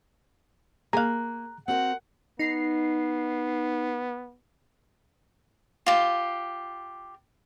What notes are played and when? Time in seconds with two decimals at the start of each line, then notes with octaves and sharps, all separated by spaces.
0.93 A#3 G#4 F5 A#5 F#6
1.68 C4 F#4 A#4 F#5
2.39 B3 D#4 C7
5.86 F4 G4